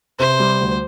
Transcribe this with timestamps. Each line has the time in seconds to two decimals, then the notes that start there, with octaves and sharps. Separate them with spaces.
0.19 C3 C5
0.39 G3
0.60 D2